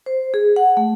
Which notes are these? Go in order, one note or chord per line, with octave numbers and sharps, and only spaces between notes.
C5
G#4
F#5
A3